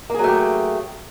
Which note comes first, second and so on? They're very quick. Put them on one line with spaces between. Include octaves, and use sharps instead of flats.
A#3 G#4 F#3 A3 G4